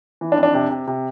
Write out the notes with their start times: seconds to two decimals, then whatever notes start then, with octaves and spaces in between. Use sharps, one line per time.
0.21 E3
0.32 D4
0.37 F2
0.43 D4
0.54 C3
0.70 C3
0.87 C3